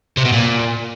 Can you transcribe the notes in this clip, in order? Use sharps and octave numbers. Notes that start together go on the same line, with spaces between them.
C3
B2
A#2